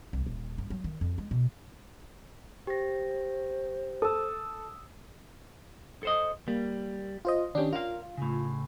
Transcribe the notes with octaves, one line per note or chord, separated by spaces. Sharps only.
C2
D#1
G2
F#3
D#3
F2
G#3
B2
G4 C5 A#6
A4 D#6 E6
A4 C5 D#5
G3 A#3
F4 C5 D#5
D#3 C#4 D4 G4
F4 A#4 F5
A2 C#3